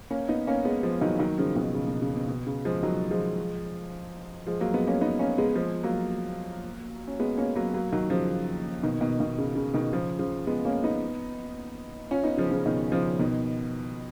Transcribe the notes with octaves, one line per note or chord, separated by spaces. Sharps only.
A#3 C#4
B3 D#4
A#3 C#4
G#3 B3
F3 G#3
D#3 F#3
D#3 F#3
C#3 F3
B2 D#3
C#3
B2
C#3
B2
B2
C#3
F3 G#3
D#3 F#3
F3 G#3
F3 G#3
F#3 A#3
G#3 B3
A#3 C#4
B3 D#4
A#3 C#4
G#3 B3
F3 G#3
F#3 A#3
C#4
G#3 B3
A#3 C#4
F#3 A#3
F#3 A#3
D#3 F#3
C#3 F3
B2 D#3
B2 D#3
B2 D#3
C#3
C#3
B2 D#3
C#3 F3
C#3 F3
G#3 B3
A#3 C#4
B3 D#4
C#4 F4
B3 D#4
C#3 F3
C#3 F3
B2 D#3
C#3 F3
B2 D#3